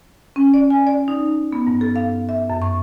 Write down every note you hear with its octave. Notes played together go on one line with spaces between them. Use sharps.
C#4
D5
G#5
D5
D#4
B3
G2
A4
F5
E5
F#2
C#6